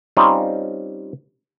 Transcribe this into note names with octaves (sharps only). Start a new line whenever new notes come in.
G3 C4 C#4 D#4 F4